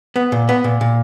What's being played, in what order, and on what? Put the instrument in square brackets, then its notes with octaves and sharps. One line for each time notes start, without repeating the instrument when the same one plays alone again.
[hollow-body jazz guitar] B3
A#2
B3
A#2
A#2